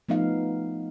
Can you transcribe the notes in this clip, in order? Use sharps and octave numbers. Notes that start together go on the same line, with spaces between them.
F3 A3 B3 D#4 F4 F5